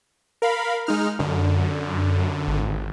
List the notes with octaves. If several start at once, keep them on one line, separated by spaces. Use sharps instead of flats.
A#4 F5 B5
G#3 D#4 F6
F#2 D3
G#1